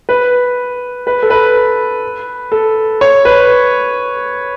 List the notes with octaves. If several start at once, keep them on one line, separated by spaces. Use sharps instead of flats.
B4
B4
A4
B4
A4
C#5
B4